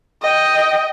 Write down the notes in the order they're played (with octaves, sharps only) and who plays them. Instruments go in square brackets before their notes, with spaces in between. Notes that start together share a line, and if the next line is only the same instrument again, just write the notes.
[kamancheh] D#5 G5